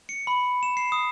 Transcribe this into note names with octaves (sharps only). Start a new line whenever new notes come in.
C#7
B5
E7
C7
D#6